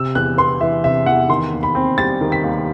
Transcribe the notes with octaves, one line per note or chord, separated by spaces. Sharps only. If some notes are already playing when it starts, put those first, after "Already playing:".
Already playing: C3 E6
E2 F#6
B3 C6
E3 E5
C3 E5
E2 F#5
D#3 C6
D#2
B5
C4
G3 A6
D#3
B6
D#2